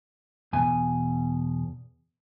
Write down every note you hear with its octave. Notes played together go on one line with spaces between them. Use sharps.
E2 B2 G#5